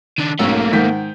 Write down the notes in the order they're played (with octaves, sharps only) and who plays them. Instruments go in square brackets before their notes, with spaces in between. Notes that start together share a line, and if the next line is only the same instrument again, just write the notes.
[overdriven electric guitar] D#3 D4
[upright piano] B1 G#2 [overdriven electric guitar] A3 A#3 [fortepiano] C#4 E6
[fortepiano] G#2 D#3 [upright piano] F#5 G6 B6